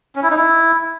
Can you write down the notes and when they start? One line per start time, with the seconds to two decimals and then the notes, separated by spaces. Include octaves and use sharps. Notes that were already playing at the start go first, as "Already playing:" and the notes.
0.16 C#4
0.23 E4
0.30 D#4
0.37 E4